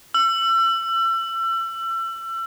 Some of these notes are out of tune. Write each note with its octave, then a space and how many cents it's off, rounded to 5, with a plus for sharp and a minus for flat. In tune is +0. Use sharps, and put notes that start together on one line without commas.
E6 +35